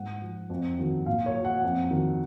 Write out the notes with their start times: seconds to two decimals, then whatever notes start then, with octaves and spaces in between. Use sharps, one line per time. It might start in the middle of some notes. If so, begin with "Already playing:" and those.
Already playing: G#2 F#5
0.22 F3
0.50 F2
0.78 D#3 F#3
1.06 A#2 F5
1.26 C#5
1.36 F#3
1.45 F#5
1.64 F2
1.91 D#3 F#3